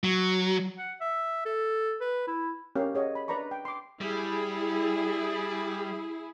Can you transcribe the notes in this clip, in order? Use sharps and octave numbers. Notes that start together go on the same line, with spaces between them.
F#3
F#5
E5
A4
B4
E4
C#4 G4 A#4 F5
G#4 C#5 D#5 F#5
B5
D4 B4 D5 A#5 B5 C#6
G5
C6 D6
G3 E4 G#4